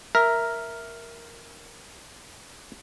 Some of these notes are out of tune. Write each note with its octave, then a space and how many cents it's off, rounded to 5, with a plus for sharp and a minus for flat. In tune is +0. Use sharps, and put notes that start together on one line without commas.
A#4 +0 E5 +0